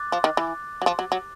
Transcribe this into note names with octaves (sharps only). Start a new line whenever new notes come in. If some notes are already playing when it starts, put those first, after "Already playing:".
Already playing: D6 F#6 A6
F3
D#3
E3
F#3
F3
F#3
F#3